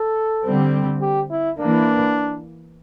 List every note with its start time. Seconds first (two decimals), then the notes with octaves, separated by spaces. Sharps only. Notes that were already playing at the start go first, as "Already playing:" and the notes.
Already playing: A4
0.45 D3 G3 C4
1.01 G4
1.31 E4
1.59 E3 A#3 D4